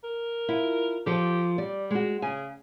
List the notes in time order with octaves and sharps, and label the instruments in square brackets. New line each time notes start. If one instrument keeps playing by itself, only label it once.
[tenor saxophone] A#4
[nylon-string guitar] E4 F4
[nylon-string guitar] F3 A4 [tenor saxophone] G4
[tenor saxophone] G3 [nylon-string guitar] D5
[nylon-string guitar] G#3 F#4
[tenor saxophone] C#3 [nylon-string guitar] G#5